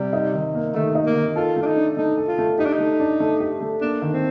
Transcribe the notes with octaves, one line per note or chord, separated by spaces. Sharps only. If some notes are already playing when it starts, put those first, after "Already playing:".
Already playing: C3 G3
D#4
D#3
A#3
D#3 A3
D#4
A#3
D#3
F4 A4
A3
D4
D#4
D4
A3 D#4
A4
F4
A3
D#4 G4
D4
D#4
A3
D4
A3
G4
A3
A#3 D4
D#3
C4